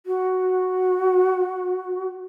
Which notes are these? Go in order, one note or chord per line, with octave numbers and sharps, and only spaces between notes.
F#4